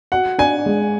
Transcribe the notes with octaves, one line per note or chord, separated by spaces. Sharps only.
F#4 F#5
D4 G#5
G#3